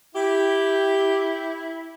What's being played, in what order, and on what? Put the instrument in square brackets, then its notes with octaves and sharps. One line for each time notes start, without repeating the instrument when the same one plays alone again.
[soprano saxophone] E4 [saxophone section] G4